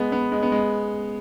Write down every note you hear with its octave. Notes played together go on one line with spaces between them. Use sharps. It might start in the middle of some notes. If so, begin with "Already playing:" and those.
Already playing: G#3 B3
B3
G#3
B3
G#3